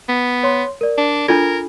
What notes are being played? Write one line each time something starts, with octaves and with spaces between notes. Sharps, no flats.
B3
C#5 C6
A#4 D5
D4
D4 F4 A4 A#4 G#6